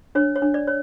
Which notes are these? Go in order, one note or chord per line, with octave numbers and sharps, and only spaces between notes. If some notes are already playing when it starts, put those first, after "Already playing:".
D4 C#5
C#5
D4
D5
C#5